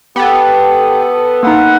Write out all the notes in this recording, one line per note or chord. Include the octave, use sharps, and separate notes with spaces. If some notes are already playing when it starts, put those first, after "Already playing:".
B3 G4 A4
A#3 D#4 B4 F#5